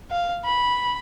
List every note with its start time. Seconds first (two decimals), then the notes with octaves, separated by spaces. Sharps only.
0.11 F5
0.44 B5